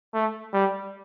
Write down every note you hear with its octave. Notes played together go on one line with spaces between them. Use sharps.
A3
G3